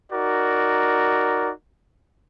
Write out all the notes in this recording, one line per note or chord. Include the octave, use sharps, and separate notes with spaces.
D#4 F#4 A#4 D5